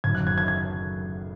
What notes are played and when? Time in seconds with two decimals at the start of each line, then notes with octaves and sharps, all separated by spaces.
0.04 F#1 F#2 D#3 G#6
0.15 F#6
0.27 G#6
0.38 G#6
0.48 G#6